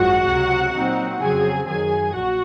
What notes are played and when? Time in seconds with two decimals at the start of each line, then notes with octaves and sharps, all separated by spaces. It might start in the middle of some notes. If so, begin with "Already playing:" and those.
Already playing: G#1 F#2 F3 G#3 F#4 F#5
0.28 C#2 C3 F#3
0.73 A#2 F#3 C4 D#4
1.20 F2 C#3 F#3 C4 G#4 G#5
1.67 F#2 D#3 F#3 G#4 G#5
2.14 A#1 A#2 F#4 F#5